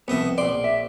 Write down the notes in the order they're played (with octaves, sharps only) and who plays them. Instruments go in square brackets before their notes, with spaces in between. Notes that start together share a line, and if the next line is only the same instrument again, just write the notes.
[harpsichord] C2 D#5 E5 [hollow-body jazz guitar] F2 B3
[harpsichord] A#1 C6 [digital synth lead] D5
[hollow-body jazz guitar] E5